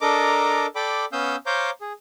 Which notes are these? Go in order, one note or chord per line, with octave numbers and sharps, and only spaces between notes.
D4 A4 A#4 D#5 A#5 D6
A4 D5 G5 B5 D6
B3 C#4 F5 D#6 E6 G6
C5 C#5 F5 A#5 D6 G6
G#4